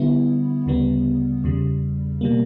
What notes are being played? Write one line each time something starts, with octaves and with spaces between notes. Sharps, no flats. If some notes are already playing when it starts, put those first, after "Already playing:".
Already playing: D3 G3 B3 E4
D2 C#3 G3 B3
E2 C#3 G3
B2 G3 A#3